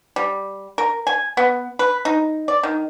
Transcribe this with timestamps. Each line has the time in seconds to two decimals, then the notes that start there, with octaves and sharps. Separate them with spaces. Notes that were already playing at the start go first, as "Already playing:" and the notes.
0.16 G3
0.78 A#4
1.07 G#5
1.37 B3
1.79 B4
2.05 D#4
2.48 D5
2.63 D#3